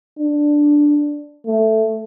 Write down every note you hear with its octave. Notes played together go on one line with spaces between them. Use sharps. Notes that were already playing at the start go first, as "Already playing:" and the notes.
D4
A3